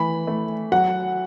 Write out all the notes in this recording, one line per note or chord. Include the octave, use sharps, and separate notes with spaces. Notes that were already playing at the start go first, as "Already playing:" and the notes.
Already playing: E3 A3 B5
A3
F#3 F#5